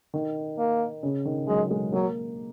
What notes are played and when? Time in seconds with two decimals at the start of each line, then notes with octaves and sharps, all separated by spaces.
0.14 D#3
0.58 A#3
1.03 C#3
1.25 D#3
1.48 F#3 G#3
1.70 G#3
1.92 F#3 A#3